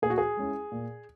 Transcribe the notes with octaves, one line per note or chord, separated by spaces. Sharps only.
A#2 G#4
F#4
G#4
G#3 C#4 E4
A#2